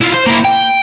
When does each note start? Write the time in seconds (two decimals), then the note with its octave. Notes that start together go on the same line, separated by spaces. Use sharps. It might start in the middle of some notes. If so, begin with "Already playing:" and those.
0.01 E4 F4
0.14 C5
0.26 A#3 E4
0.45 G5